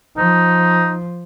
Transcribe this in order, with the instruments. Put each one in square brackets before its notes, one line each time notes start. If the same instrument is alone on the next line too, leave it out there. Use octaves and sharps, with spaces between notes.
[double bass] F3 [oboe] D#4